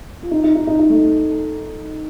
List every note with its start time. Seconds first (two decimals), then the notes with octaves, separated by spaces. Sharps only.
0.23 F4
0.31 D#4
0.44 D#4
0.55 D#4
0.67 D#4
0.79 D#4
0.90 A3